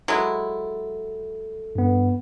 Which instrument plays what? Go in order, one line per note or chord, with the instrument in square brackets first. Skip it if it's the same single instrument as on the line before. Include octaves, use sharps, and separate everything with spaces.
[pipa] F#3 G#3 E4 [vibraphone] A4
[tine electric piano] G2 B3